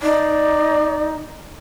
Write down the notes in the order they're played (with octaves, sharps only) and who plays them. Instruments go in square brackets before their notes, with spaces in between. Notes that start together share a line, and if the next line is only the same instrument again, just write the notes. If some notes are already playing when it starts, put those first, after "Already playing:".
[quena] D#4 [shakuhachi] D5